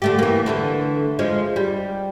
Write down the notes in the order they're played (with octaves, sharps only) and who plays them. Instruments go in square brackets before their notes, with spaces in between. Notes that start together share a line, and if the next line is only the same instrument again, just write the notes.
[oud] D3 A3 G4
E3 A#3
D3 E3 A3
F3 G#3
G3